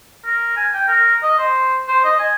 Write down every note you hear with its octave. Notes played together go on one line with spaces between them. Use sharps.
A#4
G#5
G5
A#4
D#5
C5
C5
D#5
G#5